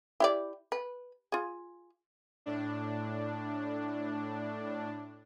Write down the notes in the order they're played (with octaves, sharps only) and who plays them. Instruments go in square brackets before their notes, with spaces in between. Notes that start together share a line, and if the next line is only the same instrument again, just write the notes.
[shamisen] E4 G4 D5
B4
F4 G#4
[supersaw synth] A2 D4